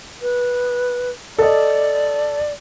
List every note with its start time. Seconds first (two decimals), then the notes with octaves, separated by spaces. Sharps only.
0.22 B4
1.38 A4 D5 D#5